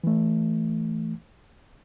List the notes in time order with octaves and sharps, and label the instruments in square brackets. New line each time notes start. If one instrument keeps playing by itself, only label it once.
[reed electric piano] E3 A3